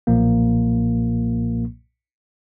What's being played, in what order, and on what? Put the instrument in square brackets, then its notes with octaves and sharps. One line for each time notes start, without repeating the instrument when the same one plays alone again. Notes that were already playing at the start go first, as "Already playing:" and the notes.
[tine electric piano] B1 A#2 F3 A#3